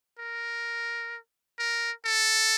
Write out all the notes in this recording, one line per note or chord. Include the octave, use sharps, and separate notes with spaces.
A#4
A#4
A4